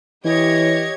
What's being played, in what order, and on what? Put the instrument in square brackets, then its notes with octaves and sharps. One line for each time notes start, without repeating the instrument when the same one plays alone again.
[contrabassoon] E3 [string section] G4 C#5 G#6 [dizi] D#5